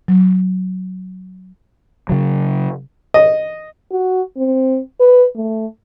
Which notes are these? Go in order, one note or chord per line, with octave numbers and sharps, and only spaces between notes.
F#3
C#3 F#3
D#5
F#4
C4
B4
A3